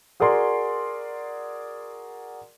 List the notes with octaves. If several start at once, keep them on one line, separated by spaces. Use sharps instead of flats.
F#4 G#4 A#4 D5 C6